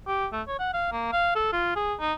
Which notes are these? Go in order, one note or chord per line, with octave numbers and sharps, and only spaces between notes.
G4
A3
C#5
F#5
F5
A#3
F5
A4
F4
G#4
D#4